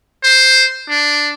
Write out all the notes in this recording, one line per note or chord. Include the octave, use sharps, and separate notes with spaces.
C5
D4